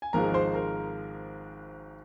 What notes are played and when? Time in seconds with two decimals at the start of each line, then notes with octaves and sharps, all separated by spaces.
0.02 G#5
0.13 G#1 G#2 F3 G#3 A#4 A#5
0.34 C5 C6
0.54 A#4 A#5